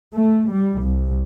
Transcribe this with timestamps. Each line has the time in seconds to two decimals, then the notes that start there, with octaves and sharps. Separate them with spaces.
0.13 A3
0.49 G3
0.79 C2